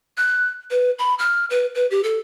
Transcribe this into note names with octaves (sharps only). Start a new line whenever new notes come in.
F#6
B4
B5
F6
B4
B4
G4
A4